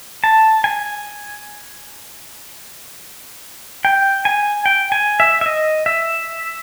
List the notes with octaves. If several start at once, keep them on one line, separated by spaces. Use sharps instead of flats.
A5
G#5
G5
G#5
G5
G#5
E5
E5
D#5
E5